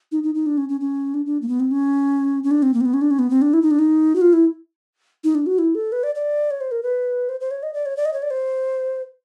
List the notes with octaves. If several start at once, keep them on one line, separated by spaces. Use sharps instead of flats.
D#4
D#4
D#4
D4
C#4
C#4
C#4
D4
D4
A#3
B3
C4
C#4
C#4
D4
C4
A#3
C4
B3
C#4
D4
C#4
B3
C4
D4
E4
D#4
D4
D#4
F#4
F4
E4
D#4
D4
F#4
E4
A4
B4
D5
D5
C#5
C5
A#4
B4
C5
C5
C#5
D#5
D5
C#5
D5
D#5
C#5
D5
C5